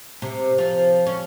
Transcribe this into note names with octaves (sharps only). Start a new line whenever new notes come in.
C3
F3
C#4